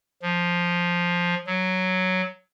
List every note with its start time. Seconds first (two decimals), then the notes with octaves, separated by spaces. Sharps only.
0.22 F3
1.46 F#3